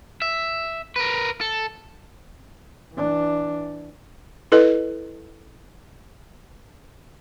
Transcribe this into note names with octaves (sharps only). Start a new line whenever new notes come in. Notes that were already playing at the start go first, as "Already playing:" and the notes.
E5
A#4 B4
A4
E3 D4
E4 A4 B4 D#5